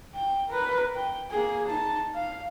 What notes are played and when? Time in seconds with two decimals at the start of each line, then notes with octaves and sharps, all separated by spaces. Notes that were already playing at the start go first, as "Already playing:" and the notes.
0.14 G5
0.49 A#4 B4
0.95 G5
1.31 A#3 G#4
1.67 D#4 A5
2.15 F5